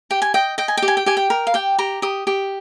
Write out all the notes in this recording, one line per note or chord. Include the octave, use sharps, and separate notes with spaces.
G4 G5
G#5
D#5 G5
D#5 G5
G#5
G5
G4
G#5
G5
G4 G#5
G5
A#4
F5
G4 G5
G4 A#5
G4 D#6
G4